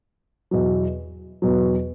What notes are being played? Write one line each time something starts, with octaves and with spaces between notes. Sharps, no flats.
E2 B2 F#3
E2 B2 F#3